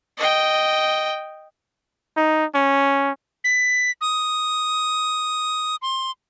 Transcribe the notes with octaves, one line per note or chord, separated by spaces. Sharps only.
D#5 G5
D#4
C#4
B6
D#6
C6